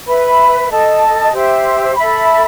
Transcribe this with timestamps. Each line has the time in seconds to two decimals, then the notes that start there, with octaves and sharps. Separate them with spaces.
0.07 B4 E5 B5
0.70 A4 D#5 A5
1.32 G4 C5 E5
1.95 A4 E5 B5